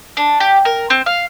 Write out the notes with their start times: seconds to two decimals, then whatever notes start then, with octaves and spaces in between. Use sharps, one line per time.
0.17 D4
0.40 G4
0.65 A#4
0.90 C4
1.06 F5